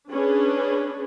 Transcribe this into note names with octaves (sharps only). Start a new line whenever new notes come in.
C#4 D4 G#4 B4